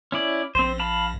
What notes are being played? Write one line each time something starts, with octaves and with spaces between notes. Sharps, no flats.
C#4 E4 D5
A#1 C4 C5
F5 A5 B5